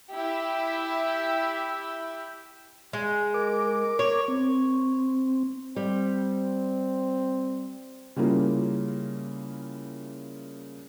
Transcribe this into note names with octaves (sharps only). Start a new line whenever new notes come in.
E4 G4 E5
G#3
A#4 D6
C#5
C4
G3 C4
C#3 G3 A#3 E4 F4 A#4